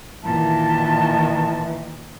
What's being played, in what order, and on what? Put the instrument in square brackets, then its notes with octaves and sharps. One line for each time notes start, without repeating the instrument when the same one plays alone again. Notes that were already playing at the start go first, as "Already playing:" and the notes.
[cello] A#2 D#3 [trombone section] E3 [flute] A5